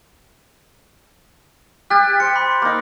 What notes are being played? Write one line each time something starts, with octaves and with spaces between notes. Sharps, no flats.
G4 F6 F#6 A6
C5 C#7
B5
A#3 D#4